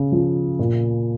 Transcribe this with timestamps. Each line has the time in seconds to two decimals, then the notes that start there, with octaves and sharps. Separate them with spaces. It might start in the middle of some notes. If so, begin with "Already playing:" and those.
Already playing: C#3
0.12 F3
0.59 A#2